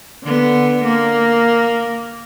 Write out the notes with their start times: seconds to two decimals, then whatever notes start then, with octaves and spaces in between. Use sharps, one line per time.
0.23 D3 B3
0.84 A#3